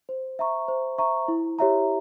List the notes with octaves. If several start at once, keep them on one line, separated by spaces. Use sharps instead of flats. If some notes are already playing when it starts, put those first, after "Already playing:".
C5
E5 A#5 C#6
C5
E5 A#5 C#6
E4
G4 C#5 E5 A#5